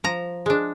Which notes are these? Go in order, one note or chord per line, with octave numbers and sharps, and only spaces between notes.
F3 A#5
G#3 D4